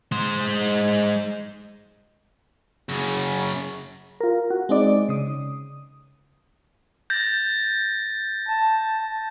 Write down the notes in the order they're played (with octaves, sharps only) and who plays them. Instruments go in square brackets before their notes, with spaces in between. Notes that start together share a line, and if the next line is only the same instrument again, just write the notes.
[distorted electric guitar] G#3 C5
F#2 C#3
[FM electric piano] F4 A#4
F#4
G#3 C4 D#4 D5
C#3 D#6
[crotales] G6 A6 A#6
[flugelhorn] A5